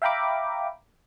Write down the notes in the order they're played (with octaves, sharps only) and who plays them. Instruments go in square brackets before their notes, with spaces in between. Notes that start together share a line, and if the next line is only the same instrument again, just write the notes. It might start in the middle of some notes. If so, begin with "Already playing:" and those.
[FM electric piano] E5 F5 G5 A#5 B5 D6